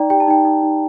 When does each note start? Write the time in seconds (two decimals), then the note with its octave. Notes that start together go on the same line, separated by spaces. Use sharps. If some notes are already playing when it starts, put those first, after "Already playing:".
Already playing: D#4 D5 G5 A#5
0.10 G4 G5
0.20 A5
0.28 D#4 G5
0.45 D#4
0.63 D#4